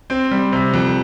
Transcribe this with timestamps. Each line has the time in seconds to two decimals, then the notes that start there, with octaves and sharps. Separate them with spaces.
0.10 C4
0.31 G3
0.52 C3
0.74 F2